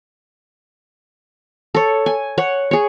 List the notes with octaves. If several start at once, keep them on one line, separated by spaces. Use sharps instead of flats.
A4 C#5
G#5
C#5 F#5
G#4 C#5